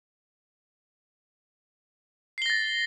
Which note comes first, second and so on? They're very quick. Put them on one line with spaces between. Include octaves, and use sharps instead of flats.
C7 G7 A#6 A6